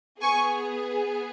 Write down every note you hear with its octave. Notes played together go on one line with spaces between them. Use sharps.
B3 G#4 G#5 C#6